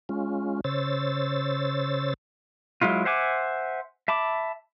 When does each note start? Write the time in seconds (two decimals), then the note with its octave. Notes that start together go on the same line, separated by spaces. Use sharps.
0.09 G#3 C#4 F4
0.64 C#3 C5 C#5 E6 A6
2.82 F#3 G#3 E4 F4
3.05 C5 E5 F#5 G#5 D6
4.08 E5 A5 B5 D6